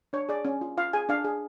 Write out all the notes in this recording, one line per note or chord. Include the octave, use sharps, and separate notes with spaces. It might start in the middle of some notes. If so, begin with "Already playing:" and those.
D4 C#5
G#4 D5
C#4
F4
F4 F5
G#4 G#5
D4 F5
G#4